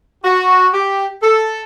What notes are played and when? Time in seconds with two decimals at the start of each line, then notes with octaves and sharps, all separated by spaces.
0.24 F#4
0.74 G4
1.23 A4